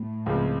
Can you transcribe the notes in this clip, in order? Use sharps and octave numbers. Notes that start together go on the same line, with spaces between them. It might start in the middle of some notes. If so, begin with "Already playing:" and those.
Already playing: A2
C#2 C#3 F3 G#3 C4